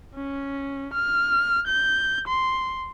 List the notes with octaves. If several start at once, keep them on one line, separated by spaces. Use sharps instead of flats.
C#4
F6
G6
C6